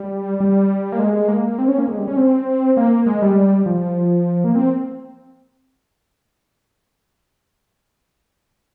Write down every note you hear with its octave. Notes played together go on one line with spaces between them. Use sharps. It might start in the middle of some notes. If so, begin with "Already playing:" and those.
Already playing: G3
G3
A#3
G#3
A#3
C4
C#4
A#3
G#3
G3
C#4
C4
A#3
G#3
G3
F3
A#3
C4